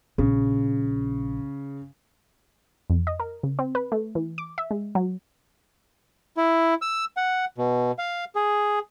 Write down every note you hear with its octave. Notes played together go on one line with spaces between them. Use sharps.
A#1 C#3
F2
D#5
A#4
C#3
C4
B4
A3
E3
D6
E5
G#3
F#3
E4
E6
F#5
B2
F5
G#4